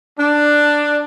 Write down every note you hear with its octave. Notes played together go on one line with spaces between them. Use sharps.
D4